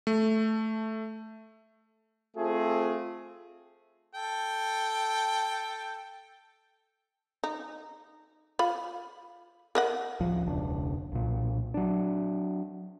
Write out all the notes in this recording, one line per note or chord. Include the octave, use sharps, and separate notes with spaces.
A3
A3 C4 F4 G#4
A4 G5
D#4
F4 B5
A#4 D#5 F#5
A1 D2 F3
E1 C#2 D4
B1 A#2
F#3 D4